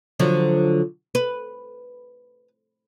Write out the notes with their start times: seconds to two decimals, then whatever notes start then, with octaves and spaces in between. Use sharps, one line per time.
0.19 D3 F3 F#3
1.15 B4